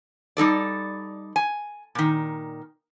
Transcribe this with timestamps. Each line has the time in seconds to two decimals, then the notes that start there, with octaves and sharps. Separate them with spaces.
0.37 G3 D#4 A4 D5
1.36 G#5
1.95 A#2 D#3